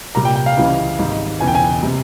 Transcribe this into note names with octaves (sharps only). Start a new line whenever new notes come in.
C2 A#2 G3 A#5
G5
G5
F5
C#2 C#3 E3 G3
G#1 G#2 G3
E1 E2 C#3 G#5
G5
G#5
C3 G3